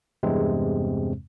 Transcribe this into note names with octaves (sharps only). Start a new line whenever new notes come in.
E2 G2 C3 G#3 C4